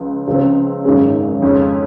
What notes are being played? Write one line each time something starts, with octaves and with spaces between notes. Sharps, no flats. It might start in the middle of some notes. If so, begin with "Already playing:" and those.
Already playing: C#2 C#3 F3
C#2 C#3 F3 C4
G#1 F#2 C#3 G#3
F2 C#3 G#3 C#4